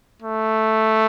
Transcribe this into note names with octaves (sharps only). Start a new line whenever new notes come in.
A3